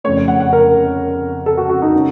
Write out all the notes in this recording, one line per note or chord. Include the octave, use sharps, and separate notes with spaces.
F2 C#3 A3 C#5
C#5
F#5
F#5
A#4
A4
F#4
F#4
D#4
C#3